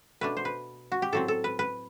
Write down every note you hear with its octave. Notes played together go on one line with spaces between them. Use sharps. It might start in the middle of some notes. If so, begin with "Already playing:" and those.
B2 A3 D4 B4
C5
B4
F#4
G4
A2 F#3 C4 A4
A4
B4
B4